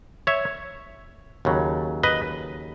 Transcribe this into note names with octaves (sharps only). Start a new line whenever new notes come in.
C#5 E5
D#2 C#3 F#3
B4 D#5